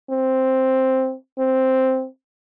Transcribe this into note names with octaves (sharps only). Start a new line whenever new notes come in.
C4
C4